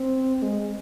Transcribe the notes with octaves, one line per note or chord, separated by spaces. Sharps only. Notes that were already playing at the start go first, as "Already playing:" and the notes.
Already playing: C4
G#3